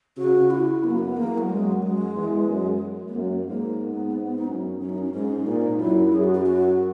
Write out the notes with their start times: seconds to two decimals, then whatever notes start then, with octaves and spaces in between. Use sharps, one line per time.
0.17 C#3 F#4
0.50 E4
0.83 F#2 B3
0.91 A#3
0.98 B3
1.16 E2 A#3
1.38 F#3
1.50 F#2 G#3
1.72 F#3
1.82 F#2 G#3
2.15 E2
2.49 F#2
3.08 B3
3.14 F#2 A#3
3.48 G#2 A#3
3.81 B3
4.38 D#4
4.47 F#2 C#4
4.81 F#2 C#4
4.89 D#4
4.98 C#4
5.14 G#2 C#4
5.46 A#2 D#4
5.79 F#2 E4
6.12 F#2 G#4
6.24 F#4
6.35 F#4
6.46 F#4